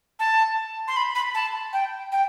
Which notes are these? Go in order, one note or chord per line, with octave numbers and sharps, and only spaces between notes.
A5
C6
B5
B5
A5
G5
G5